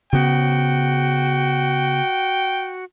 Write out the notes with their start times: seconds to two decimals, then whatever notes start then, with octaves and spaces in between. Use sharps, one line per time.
0.13 C#3 B3 F#4 G5